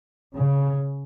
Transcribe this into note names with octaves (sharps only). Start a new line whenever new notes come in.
C#3